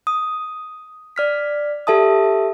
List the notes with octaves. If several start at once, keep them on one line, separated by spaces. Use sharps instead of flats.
D#6
D5 F6 B6
G4 A4 E5 A5 D#6